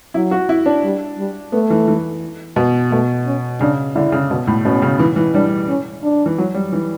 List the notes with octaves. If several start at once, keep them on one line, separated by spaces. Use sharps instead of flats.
F#3 E4
F#4
E4
D4
G3
G3
A3 B3
E3
E3
B2
B2 A3
C#4
C#3 D4
D3 E4
C#3
B2
A2
B2 C#4
C#3
E3
E3
G3 D4
C#4
D4
E3
F#3
G3
E3